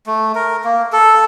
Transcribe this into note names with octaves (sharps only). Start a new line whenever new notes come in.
A3
A#4
A#3
A4